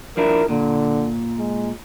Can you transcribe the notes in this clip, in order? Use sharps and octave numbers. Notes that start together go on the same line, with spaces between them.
F3 D4 E4 A#4
A#2 D3
G#3